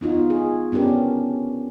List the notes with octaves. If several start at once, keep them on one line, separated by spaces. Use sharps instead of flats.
B3 D#4 F4 F#4
G#4
B3 C#4 D4 G4 A#4